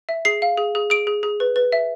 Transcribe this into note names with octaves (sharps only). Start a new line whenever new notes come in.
E5
G#4 C7
F5
G#4
G#4
G#4 D7
G#4
G#4
B4
B4
E5